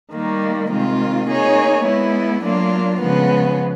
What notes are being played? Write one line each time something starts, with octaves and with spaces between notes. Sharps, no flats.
D#3 G3 A#3
C3 D#3 G#3 C4 F4
A#3 D#4 G#4 C#5
G#3 B3 E4
F#3 A#3 D4 F4
C#3 F3 G#3 B3